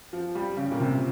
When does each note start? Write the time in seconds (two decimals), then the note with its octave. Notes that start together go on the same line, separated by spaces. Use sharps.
0.13 F3
0.35 G3
0.57 C#3
0.72 A#2
0.80 C3